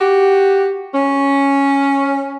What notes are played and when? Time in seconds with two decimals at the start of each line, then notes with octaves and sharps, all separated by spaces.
0.01 F#4 G4
0.94 C#4